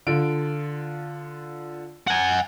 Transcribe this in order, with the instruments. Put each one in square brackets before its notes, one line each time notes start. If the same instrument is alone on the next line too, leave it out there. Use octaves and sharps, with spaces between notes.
[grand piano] D3 F4 D7
[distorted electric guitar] F#5 G#5